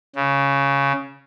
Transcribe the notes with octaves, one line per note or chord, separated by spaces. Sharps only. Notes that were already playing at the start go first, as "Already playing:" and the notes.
C#3